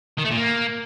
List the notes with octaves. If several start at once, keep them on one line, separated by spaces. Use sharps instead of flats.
D#3
A3
A#2
A#3